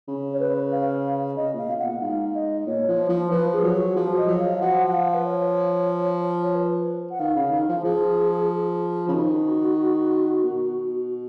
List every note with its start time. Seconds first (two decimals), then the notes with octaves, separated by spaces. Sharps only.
0.08 C#3
0.34 C#5
0.40 B4
0.72 F5
1.37 C#3 D#5
1.53 A#2 F5
1.69 B2
1.79 F#5
1.86 A#2
2.01 G#2 F5
2.34 D#5
2.66 A#2 C#5
2.88 F3
3.09 F3
3.31 F3 B4
3.53 G#4
3.63 F#3
3.75 F#4
3.95 F3 G#4
4.17 D#5
4.28 F#3
4.40 F5
4.60 F3 F#5
4.87 F#5
4.92 F5
5.14 B4
5.25 C#5
6.43 C#5
6.55 B4
7.10 F#5
7.19 D#3 F5
7.36 C#3
7.51 D#3
7.69 F3
7.84 F3 G#4
9.08 C#3
9.13 D#3 F#4
10.44 B2